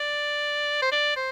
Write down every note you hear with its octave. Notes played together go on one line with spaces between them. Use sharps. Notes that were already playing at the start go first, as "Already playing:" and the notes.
Already playing: D5
C5
D5
C5